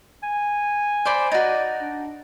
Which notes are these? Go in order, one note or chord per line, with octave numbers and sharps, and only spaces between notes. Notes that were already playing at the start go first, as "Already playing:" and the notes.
G#5
C5 D5 B5
D#4 F#4 D5
D4